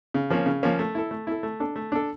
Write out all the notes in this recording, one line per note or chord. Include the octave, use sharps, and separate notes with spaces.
C#3
F3 A#3 C#4
C#3
F3 A#3 C#4
A3
E4 A4
A3
E4 A4
A3
D4 A4
A3
D4 A4